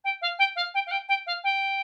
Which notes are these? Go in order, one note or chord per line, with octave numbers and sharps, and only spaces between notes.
G5
F5
G5
F5
G5
F5
G5
G5
F5
G5